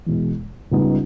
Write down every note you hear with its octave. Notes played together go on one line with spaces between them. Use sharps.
E2 B2 G#3
C#2 C#3 G3 B3 D#4